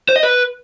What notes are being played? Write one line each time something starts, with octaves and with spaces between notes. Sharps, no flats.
C5
D#5
B4